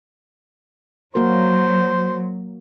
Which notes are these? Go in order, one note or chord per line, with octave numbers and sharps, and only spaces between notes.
F#3 A#3 F#4 A#4 C5